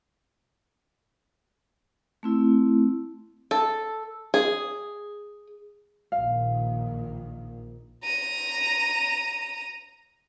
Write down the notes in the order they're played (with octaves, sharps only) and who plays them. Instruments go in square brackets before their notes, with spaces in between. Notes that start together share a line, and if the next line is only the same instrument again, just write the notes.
[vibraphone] A3 C4 E4
[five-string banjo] A4
G#4
[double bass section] A#1 A#2 D#3 [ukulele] F5
[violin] A#5 D#7